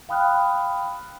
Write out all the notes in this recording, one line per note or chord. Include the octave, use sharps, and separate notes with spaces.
F5 G5 B5 D#6 F6 F#6